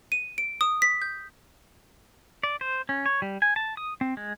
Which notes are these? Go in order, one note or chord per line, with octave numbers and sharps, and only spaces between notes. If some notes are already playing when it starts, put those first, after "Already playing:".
D#7
D7
D#6
B6
G6
D5
C5
C#4
C#5
G3
G#5
A5
D#6
C4
G#3